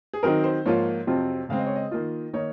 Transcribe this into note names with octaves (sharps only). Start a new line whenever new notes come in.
G#4
D#3 F#3 C4 D#4 A#4
C5
G#2 F3 A#3 F4 C#5
F2 C3 F#3 C4 F4
C#3 G#3 C4 F5
D#5
C#5
D#5
D#3 A#3 F4
D#3 A#3 D#4 C#5